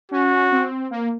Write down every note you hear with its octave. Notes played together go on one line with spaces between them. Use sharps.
C#4 F#4
C4
A#3